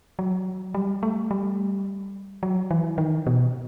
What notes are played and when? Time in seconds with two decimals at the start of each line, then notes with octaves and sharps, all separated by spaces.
0.19 F#3
0.74 G3
1.03 A3
1.31 G3
2.43 F#3
2.71 E3
2.98 D#3
3.27 B2